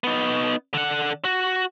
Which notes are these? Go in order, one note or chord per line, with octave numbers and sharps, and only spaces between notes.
B3 D#4
D3 F#5
F#4